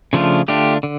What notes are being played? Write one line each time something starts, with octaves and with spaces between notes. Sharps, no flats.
C#3 F3 A3 D4 F4
D3 A3 D4 F4 G4
D3